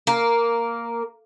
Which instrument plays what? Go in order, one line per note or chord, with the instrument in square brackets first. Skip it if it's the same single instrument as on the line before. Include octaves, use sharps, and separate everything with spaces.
[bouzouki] A#3